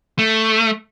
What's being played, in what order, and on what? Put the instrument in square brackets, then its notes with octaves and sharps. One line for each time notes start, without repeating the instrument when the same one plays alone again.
[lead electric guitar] A3